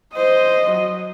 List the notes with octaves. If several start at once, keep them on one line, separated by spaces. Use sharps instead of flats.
C5 D#5
F#3